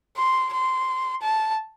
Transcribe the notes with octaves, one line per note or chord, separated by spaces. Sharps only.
C6
C6
A5